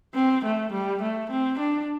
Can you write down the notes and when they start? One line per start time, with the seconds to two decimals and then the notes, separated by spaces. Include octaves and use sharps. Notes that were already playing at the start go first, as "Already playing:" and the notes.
0.15 C4
0.44 A3
0.72 G3
1.01 A3
1.30 C4
1.59 D4